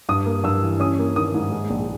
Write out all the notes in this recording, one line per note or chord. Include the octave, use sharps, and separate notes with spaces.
G2 D#6
A#3
G2 E6
E3
C#4 D#6
A#3
D#3 D#6
G#2
G#3
A#1